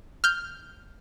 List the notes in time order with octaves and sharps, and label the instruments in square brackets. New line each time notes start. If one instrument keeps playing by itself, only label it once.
[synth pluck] F6 G6